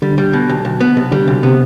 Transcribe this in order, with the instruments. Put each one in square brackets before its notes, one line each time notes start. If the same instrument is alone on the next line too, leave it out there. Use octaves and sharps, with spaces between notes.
[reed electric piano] D3 [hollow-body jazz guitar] G3
[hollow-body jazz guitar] G3
B2
B1
B1
B3
[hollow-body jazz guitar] B1 [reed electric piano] C3
[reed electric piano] D3 [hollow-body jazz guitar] G3
[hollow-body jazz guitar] B1 [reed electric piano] C3
[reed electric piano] C3 [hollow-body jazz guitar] B3